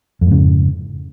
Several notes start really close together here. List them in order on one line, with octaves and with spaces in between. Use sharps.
F2 G#2 C#3